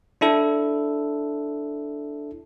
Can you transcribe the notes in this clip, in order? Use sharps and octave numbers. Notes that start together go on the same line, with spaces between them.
D4 E4 A4